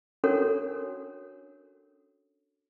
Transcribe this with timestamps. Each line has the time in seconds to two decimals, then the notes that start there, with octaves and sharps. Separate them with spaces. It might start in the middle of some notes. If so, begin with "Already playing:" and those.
0.24 C#4 D4 F#4 A4 A#4 C#5